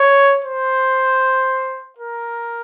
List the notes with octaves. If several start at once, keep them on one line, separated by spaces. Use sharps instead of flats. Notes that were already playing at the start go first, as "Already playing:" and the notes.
Already playing: C#5
C5
A#4